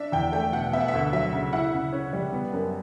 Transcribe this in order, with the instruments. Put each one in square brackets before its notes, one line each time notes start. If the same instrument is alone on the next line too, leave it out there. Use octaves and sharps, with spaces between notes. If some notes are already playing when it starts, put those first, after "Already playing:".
Already playing: [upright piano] D4 [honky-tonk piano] E5
[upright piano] E2 [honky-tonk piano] G5
[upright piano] A3 [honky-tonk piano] G5
[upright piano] B2 [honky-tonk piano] F#5
[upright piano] B3 [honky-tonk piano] E5
[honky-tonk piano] F#5
E5
[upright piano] D2
[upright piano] F#3 [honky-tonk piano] E5
[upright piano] C#3
[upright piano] E4 [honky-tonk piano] F#5
[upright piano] C#3
C#4
G3
B3
F#2